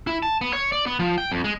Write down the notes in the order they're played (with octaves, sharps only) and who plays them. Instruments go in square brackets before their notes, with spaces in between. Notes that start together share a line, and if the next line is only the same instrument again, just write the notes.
[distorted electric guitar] E4
A5
B3
C#5
D5
B3
F3
G5
F2
G#3